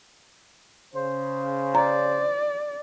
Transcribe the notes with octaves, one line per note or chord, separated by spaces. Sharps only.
C#3 C5
D5 A#5